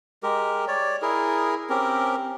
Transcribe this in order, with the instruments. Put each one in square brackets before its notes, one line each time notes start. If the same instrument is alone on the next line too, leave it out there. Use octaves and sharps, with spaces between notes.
[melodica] G#3 G4 A#4
C#5 D5
E4 G#4 A#4
C4 C#4 G4 A#4